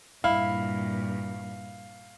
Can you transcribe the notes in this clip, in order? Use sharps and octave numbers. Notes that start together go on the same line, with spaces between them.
G2 A#2 E4 F5